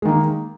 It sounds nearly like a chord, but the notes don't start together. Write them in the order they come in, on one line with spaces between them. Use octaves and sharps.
G#3 D#3 A#3